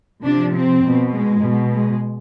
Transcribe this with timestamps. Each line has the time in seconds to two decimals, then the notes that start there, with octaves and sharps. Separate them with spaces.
0.24 C3 F3 D4
0.54 C4
0.83 B2
1.13 G#3
1.42 B2
1.72 G#3